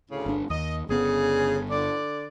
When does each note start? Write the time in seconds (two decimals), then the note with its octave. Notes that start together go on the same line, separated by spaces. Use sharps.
0.10 D2 A2 C#3
0.26 G1 D4
0.50 D#2 D#5
0.89 G1 C#3 B3 G#4
1.70 D3 D5